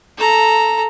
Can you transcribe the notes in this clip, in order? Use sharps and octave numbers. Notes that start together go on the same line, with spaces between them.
A4 A#5